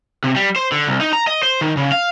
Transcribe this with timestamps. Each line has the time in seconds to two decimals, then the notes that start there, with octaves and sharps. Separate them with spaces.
0.24 C3
0.36 G3
0.56 C5
0.72 D3
0.87 C2
1.01 D#4
1.13 A#5
1.27 D#5
1.43 C5
1.61 D#3
1.77 C#3
1.92 F5